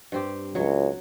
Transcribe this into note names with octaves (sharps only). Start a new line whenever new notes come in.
G2 C4 G4
C#2 F#3 F#4